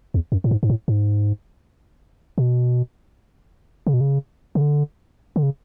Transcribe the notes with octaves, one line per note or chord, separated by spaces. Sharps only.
E2
F#2
A2
G#2
G#2
A2
G#2
B2
C#3
B2
C#3
C#3
D3
D3
C#3